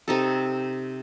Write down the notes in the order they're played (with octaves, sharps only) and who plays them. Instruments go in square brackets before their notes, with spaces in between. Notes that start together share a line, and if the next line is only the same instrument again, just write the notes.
[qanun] C3 D#4 A4